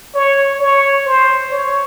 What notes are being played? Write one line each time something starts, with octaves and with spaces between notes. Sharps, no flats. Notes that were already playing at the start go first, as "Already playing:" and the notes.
C#5
C#5
C5
C#5